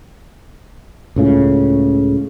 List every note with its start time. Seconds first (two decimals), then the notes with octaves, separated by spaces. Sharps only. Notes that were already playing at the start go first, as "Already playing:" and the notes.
1.16 C#2 A2 C#3